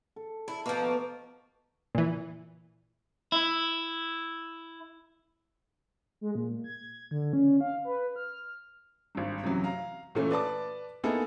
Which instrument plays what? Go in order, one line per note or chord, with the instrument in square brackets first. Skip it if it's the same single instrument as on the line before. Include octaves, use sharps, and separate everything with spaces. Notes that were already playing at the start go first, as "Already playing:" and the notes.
[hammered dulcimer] A4
[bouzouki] E4 [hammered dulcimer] A4
[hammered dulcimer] B2 [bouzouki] F3 A#3
[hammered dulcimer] A5 C#6
[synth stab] A#2 E3
[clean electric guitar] E4
[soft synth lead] G#3
A#2
G#6
D3
C#4
F5
B4
F6
[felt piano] G#1 G2
F#2 C3 E3 F#3
F5 A#5
A#2 E3 A3 C#4
B4 D5 A5 D6
A#3 B3 D#4 E4 G#4 A4